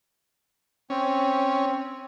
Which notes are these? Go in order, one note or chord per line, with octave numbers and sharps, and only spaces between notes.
C4 C#4